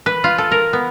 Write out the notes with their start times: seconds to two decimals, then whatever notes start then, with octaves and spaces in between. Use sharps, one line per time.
0.06 B4
0.24 F4
0.38 A4
0.52 A#4
0.73 B3